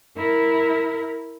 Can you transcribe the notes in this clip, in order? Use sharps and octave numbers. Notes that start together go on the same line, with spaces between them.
E4 A#4